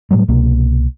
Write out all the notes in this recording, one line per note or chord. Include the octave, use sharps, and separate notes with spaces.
A2 F#3 G3 A3
C2 B2 A#3